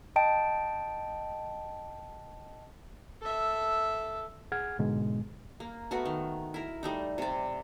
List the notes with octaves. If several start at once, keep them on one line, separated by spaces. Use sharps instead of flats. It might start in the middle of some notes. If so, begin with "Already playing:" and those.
D#5 G5 A5 D7
A4 E5
G#4 F#5 F6 G#6
G#2 B2 D3 G#3
A#3
A3 B3 F#4 A#4
D#3
E4 A#4
G3 A3 D#4
C3 D5